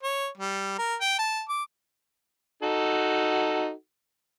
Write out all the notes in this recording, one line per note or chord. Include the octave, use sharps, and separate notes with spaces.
C#5
G3
A#4
G5
A5
D6
D#4 F#4 A4